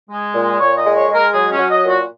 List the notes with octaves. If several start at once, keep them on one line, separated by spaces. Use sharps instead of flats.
G#3
A#2
A#2 C#5
D#5
G#3
C#5
G#3
A#4
F#3 G#4
C#4
F#3
D#5
A#2
F#4